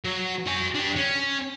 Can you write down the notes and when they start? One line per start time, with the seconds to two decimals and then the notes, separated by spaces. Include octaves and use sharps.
0.05 F#3
0.47 F#4 G#5
0.75 G3 D4
0.96 C#4